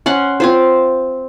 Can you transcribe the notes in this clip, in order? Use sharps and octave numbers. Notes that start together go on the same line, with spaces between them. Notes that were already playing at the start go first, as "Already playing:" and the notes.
C#4 F#5 C6
C4 F4 C5